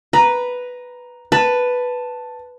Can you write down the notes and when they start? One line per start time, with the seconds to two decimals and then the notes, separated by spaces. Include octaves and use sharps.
0.13 B4 A#5
1.32 B4 A5